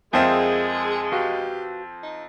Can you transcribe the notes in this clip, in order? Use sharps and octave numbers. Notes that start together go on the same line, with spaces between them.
F2 G#3 C4 G#4 A#4 E5 F5 G5
F#4 G4 B4 F5
D#4